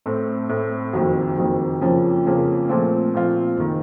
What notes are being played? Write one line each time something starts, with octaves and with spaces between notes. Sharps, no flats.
A2 A3 C4
A2 A3 C4
F#1 F2 D#3 F#3
F#1 F2 D#3 F#3
F2 C#3 F3 A#3 C#4
F2 C#3 F3 A#3 C#4
A#2 F3 A3 C4 F4
A#2 F3 A3 C4 F4
F#1 D#3